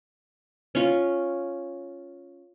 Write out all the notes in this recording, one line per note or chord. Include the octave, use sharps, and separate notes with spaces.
C#4 F4